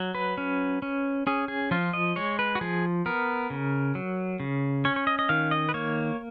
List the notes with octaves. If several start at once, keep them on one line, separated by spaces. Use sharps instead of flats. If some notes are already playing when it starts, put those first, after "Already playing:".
Already playing: F#3
B4
C#4
C#4
C#4 G#4
G#4
F3 F4
D#5
G#3 C#5
B4
F#4
F3 G#4
B3 A#4
C#3
F#3
C#3
C#4 C#5
C#5
D#5
D#5
D#3 F5
D#5
B4
A#3 C#5